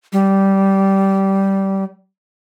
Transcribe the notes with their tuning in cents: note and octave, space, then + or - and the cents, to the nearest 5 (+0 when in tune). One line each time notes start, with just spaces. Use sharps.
G3 -15